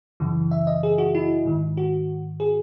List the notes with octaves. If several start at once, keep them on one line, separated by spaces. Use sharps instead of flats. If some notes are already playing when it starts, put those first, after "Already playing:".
F#2 C#3 E3
E5
D#5
G#4
F#4
E4
G#2 D#3
F#4
G#4